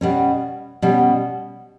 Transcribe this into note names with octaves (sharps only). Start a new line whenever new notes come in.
B2 G3 C#4
B2 G3 C#4